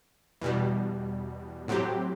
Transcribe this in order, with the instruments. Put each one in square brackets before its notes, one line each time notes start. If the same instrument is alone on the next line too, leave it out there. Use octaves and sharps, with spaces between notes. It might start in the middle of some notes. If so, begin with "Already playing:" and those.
[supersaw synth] E2 B2 G3
A2 F#3 C4 G4